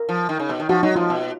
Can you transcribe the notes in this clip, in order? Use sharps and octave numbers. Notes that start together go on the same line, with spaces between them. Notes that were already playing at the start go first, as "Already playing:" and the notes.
Already playing: A#4
F3
D#3
C#3
B2
D#3
F3 F#4
F#3 D#4
F3 F4
B2